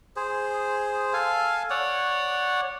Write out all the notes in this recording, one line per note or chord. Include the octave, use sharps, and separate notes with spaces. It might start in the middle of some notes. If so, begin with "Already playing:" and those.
G#4 C5
A4 F5 G#5
C#5 D5 F#5